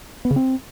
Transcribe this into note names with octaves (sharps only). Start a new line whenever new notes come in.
B3
C#3
C4